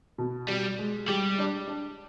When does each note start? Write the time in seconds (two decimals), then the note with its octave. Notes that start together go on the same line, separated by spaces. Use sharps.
0.18 B2
0.48 B2 G3
0.79 G#3
1.08 G3 G4
1.38 D4
1.67 D4